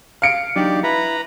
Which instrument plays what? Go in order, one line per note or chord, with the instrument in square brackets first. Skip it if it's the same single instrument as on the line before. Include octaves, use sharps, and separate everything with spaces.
[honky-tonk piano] F5 C#7 D7
[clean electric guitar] F#3 D4 D#4 [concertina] G4 D5
[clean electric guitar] E4 [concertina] B4 A#5 B5